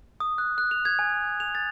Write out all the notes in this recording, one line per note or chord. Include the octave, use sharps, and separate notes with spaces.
D#6
F#6
F#6
F7
G#6
G#5
F7
A6